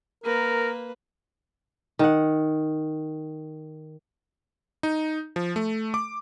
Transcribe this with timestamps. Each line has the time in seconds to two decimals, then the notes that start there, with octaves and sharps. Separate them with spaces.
0.24 A#3 A#4 B4
1.99 D#3 F#5
4.83 D#4
5.36 F3
5.56 A3
5.94 D6